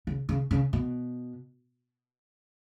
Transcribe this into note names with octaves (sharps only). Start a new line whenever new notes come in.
C#3
C#3
C#3
B2